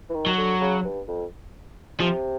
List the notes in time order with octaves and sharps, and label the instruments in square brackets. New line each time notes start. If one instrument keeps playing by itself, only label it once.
[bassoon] E3
D#3
[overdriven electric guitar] F#3
[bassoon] D3
C#3
G2
F2
[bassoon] C3 [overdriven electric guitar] F3